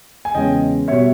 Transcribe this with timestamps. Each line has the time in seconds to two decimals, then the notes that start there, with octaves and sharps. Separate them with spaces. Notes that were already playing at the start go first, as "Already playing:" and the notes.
0.25 G#5
0.35 E2 C#3 G#3 C#4 D#5 G5
0.88 B2 G3 B3 C#5 E5